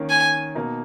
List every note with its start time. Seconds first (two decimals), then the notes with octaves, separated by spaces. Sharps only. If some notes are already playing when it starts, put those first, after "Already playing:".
Already playing: D#3 A#3 C#4
0.10 G#5
0.55 B2 A#3 D#4